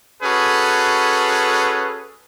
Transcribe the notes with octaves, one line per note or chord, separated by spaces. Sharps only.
C#4 F#4 G#4 A4 B4